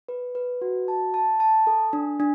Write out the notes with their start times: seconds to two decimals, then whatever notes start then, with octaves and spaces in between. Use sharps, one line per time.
0.09 B4
0.35 B4
0.61 F#4
0.88 A5
1.14 A5
1.40 A5
1.67 A4
1.93 D4
2.20 D4